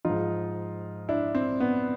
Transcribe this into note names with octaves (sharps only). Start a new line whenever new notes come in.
G#2 F3 D#4 F4
D4 E4
C4
B3